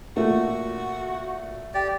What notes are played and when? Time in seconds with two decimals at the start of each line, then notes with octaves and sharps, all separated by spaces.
0.17 A#2 A3 F#4
1.74 G4 D5